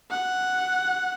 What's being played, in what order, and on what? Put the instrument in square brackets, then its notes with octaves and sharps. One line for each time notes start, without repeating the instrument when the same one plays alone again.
[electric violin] F#5